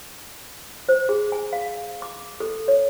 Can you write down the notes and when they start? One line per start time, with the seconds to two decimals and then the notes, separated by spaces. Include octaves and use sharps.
0.89 C5
1.09 G#4
1.32 G#5
1.53 F5
2.02 D6
2.40 A4
2.68 C#5